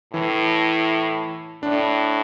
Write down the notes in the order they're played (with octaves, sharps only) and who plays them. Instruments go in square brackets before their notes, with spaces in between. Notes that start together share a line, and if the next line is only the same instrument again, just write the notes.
[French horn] A2 [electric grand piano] E3
[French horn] A2 [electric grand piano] D4